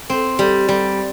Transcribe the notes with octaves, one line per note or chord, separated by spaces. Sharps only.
C4
G3
G3